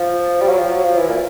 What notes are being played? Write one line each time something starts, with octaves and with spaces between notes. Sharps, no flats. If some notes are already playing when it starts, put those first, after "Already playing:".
Already playing: F3
G3
F#3
F3
F#3
F3
E3
A#2